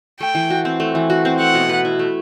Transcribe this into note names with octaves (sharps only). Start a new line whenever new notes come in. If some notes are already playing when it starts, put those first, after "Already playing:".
A3 G5
E3
F#4
C4
A3
E3
F#4
C4
A3 F#5
B2
B4
E4
A3